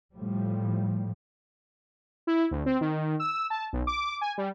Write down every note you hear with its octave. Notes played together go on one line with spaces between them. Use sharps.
A2 F3 G3
E4
D2
C4
D#3
E6
A5
B1
D6
G#5
G3